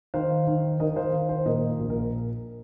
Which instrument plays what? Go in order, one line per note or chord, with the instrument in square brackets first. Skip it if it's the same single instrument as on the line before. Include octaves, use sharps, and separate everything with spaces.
[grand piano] D#3 C5 F5
D#3
D#3 A#4 D#5
C5 F5
D#3
C5
A#2 A#4 D#5
A#1
A#4